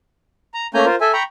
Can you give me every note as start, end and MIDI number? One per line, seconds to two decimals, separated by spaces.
0.54 0.67 82
0.74 0.85 57
0.74 0.85 58
0.74 0.85 61
0.74 0.85 80
0.74 0.85 82
0.74 0.85 91
0.86 0.95 65
0.86 0.95 70
0.86 0.95 72
1.01 1.12 69
1.01 1.12 76
1.01 1.12 80
1.13 1.23 79
1.13 1.23 82
1.13 1.23 83
1.13 1.23 85